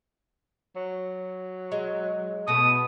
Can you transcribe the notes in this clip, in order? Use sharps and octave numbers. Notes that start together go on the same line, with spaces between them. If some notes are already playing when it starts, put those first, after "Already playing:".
F#3
G#3
B2 A3 B3 D#6